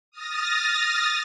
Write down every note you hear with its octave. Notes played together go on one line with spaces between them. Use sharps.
D#6 F6 A6 A#6